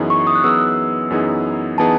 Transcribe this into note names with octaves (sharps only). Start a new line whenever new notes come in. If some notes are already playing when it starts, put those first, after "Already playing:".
Already playing: F#2 E3 B3 D#4 G#4
C#6
D#6
F#6
F#2 E3 B3 D#4 G#4 E6
F#2 E3 B3 D#4 G#4
E3 B3 D#4 G#4 A5